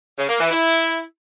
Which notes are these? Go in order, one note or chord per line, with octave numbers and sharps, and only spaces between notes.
C#3
A#3
E3
E4